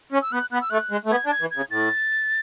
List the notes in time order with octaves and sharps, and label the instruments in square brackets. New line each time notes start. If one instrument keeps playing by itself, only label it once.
[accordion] C#4
[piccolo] E6
[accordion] B3 [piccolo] F#6
[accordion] B3 [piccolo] F#6
[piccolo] E6
[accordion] A3 [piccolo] F#6
[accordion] G#3
A3
[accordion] B3 [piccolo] G#6
[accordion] D4
[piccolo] G#6
[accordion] E3
[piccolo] G#6
[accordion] C#3
[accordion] A2 [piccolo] A6